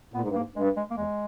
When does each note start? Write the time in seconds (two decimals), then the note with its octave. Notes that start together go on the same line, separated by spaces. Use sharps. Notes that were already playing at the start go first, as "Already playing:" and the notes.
0.14 A#2 B3
0.21 G#2
0.28 G2
0.35 G#2 A#3
0.56 G2 G#3
0.77 G#3
0.91 A#3
0.97 E2 G#3